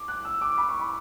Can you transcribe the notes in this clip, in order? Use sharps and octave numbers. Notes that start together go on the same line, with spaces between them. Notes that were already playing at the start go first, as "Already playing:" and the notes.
Already playing: D6
F#6
E6
D6
B5
C#6
B5